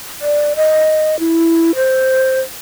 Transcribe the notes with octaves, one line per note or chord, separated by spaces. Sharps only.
D5
D#5
E4
C5